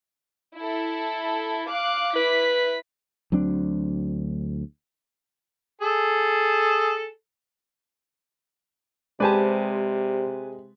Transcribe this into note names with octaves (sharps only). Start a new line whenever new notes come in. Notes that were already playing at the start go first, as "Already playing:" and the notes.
E4 A4
F5 D6 F#6
E4 B4 B6
D2 F#3 C4 D4
G#4 A4
C3 G#3 G4 B4 C5 D5 G#5 A5